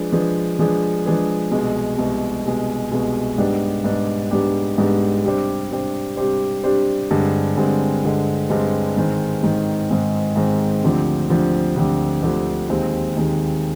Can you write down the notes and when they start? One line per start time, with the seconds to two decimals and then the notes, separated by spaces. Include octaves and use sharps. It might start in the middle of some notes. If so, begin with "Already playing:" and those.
Already playing: F3 G#3 D4 G#4 B4
0.12 F3 G#3 D4 G#4 B4
0.59 F3 G#3 D4 G#4 B4
1.05 F3 G#3 D4 G#4 B4
1.52 C2 B2 G#3
1.98 C2 B2 G#3
2.45 C2 B2 G#3
2.92 C2 B2 G#3
3.38 G#2 G3 B3 D4 G4
3.84 G#2 G3 B3 D4 G4
4.31 G#2 G3 B3 D4 G4
4.78 G#2 G3 B3 D4 G4
5.24 C3 G3 D4 G4 C5
5.71 C3 G3 D4 G4 C5
6.17 C3 G3 D4 G4 C5
6.64 C3 G3 D4 G4 C5
7.10 G2 D3 G#3 C4
7.57 G2 D3 G#3 C4
8.03 G2 D3 G#3 C4
8.50 G2 D3 G#3 C4
8.97 G#2 D#3 G#3 C4
9.43 G#2 D#3 G#3 C4
9.90 G#2 D#3 G#3 C4
10.36 G#2 D#3 G#3 C4
10.83 D2 D3 F3 C4 G4
11.30 D2 D3 F3 C4 G4
11.76 D2 D3 F3 C4 G4
12.22 D2 D3 F3 C4 G4
12.69 D#2 D#3 G#3 C4
13.16 D#2 D#3 G#3 C4